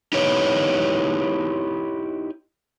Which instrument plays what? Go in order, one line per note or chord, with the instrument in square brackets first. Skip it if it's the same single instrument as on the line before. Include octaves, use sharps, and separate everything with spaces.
[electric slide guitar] D#4 E4 G4 B4 C#5